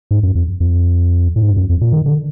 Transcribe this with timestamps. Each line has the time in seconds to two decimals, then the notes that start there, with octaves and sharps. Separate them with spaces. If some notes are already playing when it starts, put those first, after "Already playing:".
0.11 G#2
0.23 F#2
0.35 F2
0.60 F2
1.36 A2
1.43 G#2
1.50 G2
1.57 F#2
1.69 F2
1.81 A#2
1.93 D#3
2.06 D3